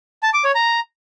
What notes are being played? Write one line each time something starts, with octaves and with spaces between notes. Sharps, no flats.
A5
D6
C#5
A#5